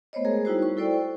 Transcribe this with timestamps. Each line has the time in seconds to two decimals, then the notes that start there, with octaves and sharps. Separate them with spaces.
0.13 A3 B3 C5 C#5 D#5
0.25 G#3 G#4 A#4 A#5
0.45 G3 D#4 E4 F#4 C5
0.62 C#6
0.77 E4 A4 C5 D5 G5
0.94 C#6